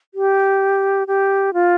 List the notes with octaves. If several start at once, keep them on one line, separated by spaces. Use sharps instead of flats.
G4
G4
F4